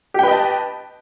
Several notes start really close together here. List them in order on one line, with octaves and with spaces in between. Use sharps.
G4 G5 B4 D#5 A5